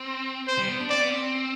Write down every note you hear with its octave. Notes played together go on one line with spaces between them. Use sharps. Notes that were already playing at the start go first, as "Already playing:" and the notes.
Already playing: C4
C5
G3
B3
D4
C4 D5
B3
C4